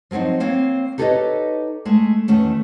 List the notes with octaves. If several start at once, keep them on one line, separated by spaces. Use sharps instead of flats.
F3 F#3 A#3 C4 D#4
A#3 C4 C#5 F5
D#4 G4 A4 B4 C#5 D#5
G#3 A3
E2 D#3 A3 C#4